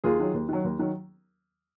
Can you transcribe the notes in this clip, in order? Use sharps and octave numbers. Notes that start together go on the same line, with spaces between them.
D#2 F4 G#4
D#3 F#3
D#2
D#3 F#3
D#2
D#3 F#3